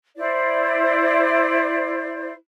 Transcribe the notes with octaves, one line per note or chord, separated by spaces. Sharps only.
E4 C5 D5